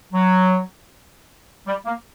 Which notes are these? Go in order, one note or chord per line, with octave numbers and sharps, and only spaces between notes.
F#3
G3
A#3